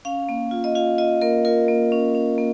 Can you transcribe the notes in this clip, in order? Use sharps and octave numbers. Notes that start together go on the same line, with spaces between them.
C#4 F5
A#3
F4
D#5
F4 F5
F4 D#5
A#3 A#4
F4 A#4
A#3
C#4
C#4
A#3